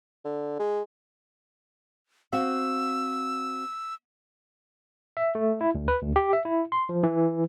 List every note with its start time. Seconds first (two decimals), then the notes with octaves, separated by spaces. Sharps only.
0.25 D3
0.59 G#3
2.32 C4 F#4 F5 E6
5.17 E5
5.35 A3
5.61 E4
5.75 D2
5.88 B4
6.02 D2
6.16 G4
6.33 E5
6.45 E4
6.72 C6
6.89 F3
7.03 E3